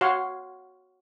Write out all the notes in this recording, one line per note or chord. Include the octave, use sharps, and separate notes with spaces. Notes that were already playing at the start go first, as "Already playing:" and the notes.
F#4 C#5 F5 F#5 C6